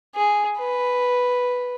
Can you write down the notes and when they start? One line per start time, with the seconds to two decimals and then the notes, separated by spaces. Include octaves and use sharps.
0.16 G#4
0.59 B4